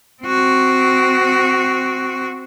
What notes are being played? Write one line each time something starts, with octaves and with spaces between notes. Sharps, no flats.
C4 F#4